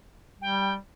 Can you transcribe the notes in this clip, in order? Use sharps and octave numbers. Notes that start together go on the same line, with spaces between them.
G3 G5